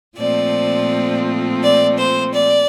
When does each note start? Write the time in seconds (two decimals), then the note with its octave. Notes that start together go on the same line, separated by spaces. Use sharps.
0.16 A#2 F3 A3 C4 D5
1.61 D5
1.97 C5
2.33 D5